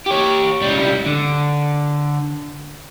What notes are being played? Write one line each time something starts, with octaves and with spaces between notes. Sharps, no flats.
G4 C#5
C#2 G3
D3